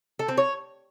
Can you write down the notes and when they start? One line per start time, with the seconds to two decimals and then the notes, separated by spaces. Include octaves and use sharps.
0.19 A4
0.28 C4
0.38 C#5